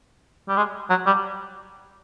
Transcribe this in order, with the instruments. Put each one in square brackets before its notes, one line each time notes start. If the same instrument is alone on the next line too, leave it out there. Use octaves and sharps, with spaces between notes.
[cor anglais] G3
G#3
F#3
G3